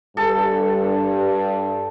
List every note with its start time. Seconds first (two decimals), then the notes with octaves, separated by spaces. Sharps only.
0.17 G2 A4